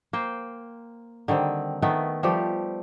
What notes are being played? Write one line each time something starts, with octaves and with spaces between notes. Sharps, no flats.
A#3 C5 G5
D3 D#3 G3 C4
D#3 A3 B3
F3 G3 A3 G4